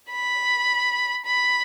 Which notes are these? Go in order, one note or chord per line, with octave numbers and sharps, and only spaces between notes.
B5
B5